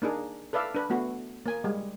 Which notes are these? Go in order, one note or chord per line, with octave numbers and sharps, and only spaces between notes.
A#3 D4 D#4 G#4
A4 B4 D5 E5 F5
D4 B4
A3 B3 F#4
A#3 G#5
G3 G#3